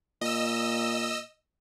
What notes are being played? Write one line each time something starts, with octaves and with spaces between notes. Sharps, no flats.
A#2 D#5 E6